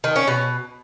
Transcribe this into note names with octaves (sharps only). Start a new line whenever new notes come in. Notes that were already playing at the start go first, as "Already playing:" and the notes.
D#3
C#4
B2